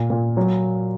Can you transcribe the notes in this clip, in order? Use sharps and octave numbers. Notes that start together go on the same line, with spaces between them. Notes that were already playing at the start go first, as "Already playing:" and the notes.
Already playing: A#2
A#2
F#3